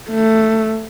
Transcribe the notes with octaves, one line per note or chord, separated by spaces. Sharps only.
A3